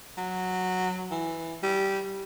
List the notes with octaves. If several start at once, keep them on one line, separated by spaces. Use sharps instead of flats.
F#3
E3
G3